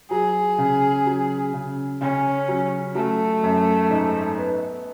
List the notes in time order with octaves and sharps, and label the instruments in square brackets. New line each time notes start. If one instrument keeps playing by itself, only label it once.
[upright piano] F#3 [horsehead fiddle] G#4
[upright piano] C#3
F#3
C#3
[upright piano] C#3 [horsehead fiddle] C#4
[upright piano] F#3
[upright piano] F#3 [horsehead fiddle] A3
[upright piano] F#2
G#2
B3